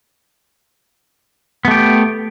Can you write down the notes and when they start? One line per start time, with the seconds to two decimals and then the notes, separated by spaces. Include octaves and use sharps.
1.65 B3
1.68 A3
1.71 G4